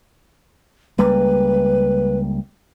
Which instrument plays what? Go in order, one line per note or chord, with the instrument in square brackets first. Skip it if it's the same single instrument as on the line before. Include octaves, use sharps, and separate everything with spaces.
[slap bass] C#2 G3 A#3 [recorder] B4